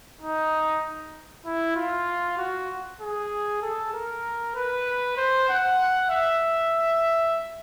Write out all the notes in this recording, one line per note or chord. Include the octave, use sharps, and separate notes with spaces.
D#4
E4
F4
F#4
G#4
A4
A#4
B4
C5
F#5
E5